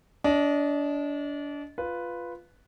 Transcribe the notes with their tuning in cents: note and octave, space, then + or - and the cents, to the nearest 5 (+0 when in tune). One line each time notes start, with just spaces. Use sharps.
D4 -30 D#5 +0
F4 +0 B4 +0